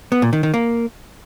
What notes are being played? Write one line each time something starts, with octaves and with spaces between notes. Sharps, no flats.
B3
A#2
D#3
D#3
A#3